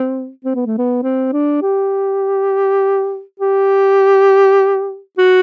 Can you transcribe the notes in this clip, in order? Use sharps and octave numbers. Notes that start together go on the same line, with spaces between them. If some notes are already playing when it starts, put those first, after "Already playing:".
Already playing: C4
C4
B3
A3
B3
C4
D4
G4
G4
F#4